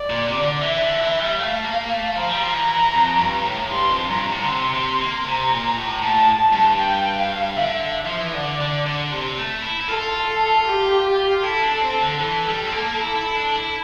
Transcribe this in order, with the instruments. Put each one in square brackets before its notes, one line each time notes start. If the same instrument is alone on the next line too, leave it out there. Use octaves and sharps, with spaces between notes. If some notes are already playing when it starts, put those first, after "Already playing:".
Already playing: [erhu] D5
[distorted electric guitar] A#2
C3
D3
[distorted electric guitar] E3 [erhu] E5
[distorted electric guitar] D3
E3
G3
[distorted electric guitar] A3 [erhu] F5
[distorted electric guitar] A#3
A3
[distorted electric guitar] F3 [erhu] A#5
[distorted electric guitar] G3
F3
E3
F2
G2
A2
[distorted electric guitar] G2 [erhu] C6
[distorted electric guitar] F2
[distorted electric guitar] G2 [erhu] A#5
[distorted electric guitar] A2
D3
[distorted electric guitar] C3 [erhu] C6
[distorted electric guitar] C3
A#3
[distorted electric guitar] C3 [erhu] A#5
[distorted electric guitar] A#2
A2
[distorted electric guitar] A2 [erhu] A5
[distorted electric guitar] G2
[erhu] G5
F5
[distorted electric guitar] D3 [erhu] E5
[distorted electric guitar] F3
E3
[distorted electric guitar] D3 [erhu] D5
[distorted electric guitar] D3
D3
C3
A3
E4
E4
[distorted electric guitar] F4 [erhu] A4
[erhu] G4
[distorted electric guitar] E4 [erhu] A4
[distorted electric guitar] D4
C4
D3
[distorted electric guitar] E3 [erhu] A4
[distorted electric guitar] G3
C4
A#3
[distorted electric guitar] E4 [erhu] A4
[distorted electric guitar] E4
D4
E4